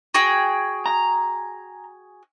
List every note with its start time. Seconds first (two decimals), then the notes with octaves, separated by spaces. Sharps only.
0.14 F#4 G#4 G5
0.86 A#5